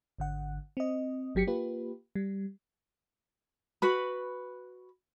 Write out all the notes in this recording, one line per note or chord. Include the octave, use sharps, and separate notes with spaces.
G#1 D3 F#5
C4 D#5
G1 F#3 G4 B6 C#7
A#3 F4 G4 B4
G3
F#4 B4 B5